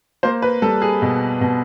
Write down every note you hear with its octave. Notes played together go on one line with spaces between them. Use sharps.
A#3 C5
B4
G3 A4
G#4
B2
B2